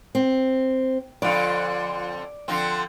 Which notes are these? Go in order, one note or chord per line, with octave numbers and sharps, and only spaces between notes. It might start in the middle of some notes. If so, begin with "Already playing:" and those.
C4
F2 D3 F4 D5
D3 F3 C4